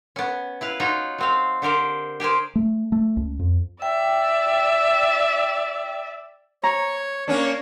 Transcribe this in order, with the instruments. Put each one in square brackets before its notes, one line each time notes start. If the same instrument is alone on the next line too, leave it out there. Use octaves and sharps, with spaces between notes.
[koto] B3 C#4
E4 B4 F5
D#4 F4 F#4 C#5 D#5
F#3 C4 F5
D3 G4 A#4 C5
G4 G#4 A#4 C5
[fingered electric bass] A3
A3
C#2
F2
[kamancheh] D5 E5 [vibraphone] G5
[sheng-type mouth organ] C#5 [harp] A#5
[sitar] A#3 C#4 D4 [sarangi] C#5